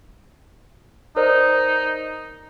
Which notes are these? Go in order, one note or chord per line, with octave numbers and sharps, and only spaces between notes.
D#4 A#4 C5 D5